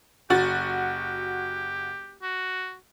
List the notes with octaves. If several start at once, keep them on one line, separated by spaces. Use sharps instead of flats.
F#1 F#4 G4 A6
F#4